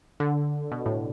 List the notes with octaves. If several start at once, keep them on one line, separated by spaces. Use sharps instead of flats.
D3
B2
A2